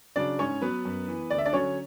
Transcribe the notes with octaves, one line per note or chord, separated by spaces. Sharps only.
C#3 F#3 D4 D5
G#2 C#4 C#5
F#3 B3 B4
F#2
E3
D2 D5
E5
D4 D5
D3 F#3 C#4 C#5